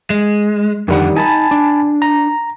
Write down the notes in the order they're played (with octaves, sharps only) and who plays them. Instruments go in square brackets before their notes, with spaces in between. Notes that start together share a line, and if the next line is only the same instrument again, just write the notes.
[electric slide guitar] G#3
[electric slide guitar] F2 D3 F#5 [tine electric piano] D#3 G3
[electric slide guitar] D#4 [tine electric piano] G#5 A5 B5
[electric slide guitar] D4
[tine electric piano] A#5